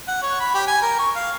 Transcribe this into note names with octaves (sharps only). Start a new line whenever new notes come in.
F#5
C#5
B5
G4
G#5
A#4
C#6
F5